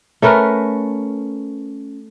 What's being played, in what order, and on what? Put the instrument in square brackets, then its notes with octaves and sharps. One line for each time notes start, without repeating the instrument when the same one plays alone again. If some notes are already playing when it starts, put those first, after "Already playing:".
[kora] A3 C#4 A#4 B4